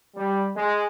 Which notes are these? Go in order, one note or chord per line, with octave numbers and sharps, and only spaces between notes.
G3
G#3